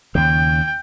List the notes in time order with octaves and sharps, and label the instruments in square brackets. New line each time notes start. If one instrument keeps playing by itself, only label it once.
[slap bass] D#2 C#3 [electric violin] G5